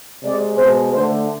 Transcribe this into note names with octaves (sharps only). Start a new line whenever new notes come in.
C3 G#3 D5
B2 G#3 C5
D3 A3 C5